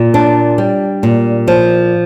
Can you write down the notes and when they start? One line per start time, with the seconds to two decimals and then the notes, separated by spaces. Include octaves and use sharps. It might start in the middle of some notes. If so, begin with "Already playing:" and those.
Already playing: A#2
0.14 D4
0.58 G3
1.03 A#2
1.48 F3